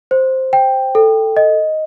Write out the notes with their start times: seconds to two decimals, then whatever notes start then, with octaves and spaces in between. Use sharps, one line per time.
0.11 C5
0.53 G5
0.95 A4
1.37 D#5